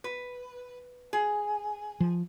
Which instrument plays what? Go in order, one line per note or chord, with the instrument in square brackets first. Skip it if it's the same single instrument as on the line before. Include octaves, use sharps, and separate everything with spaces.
[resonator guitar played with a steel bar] B4
G#4
[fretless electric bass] F3